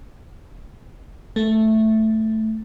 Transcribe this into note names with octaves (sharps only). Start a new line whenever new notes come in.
A3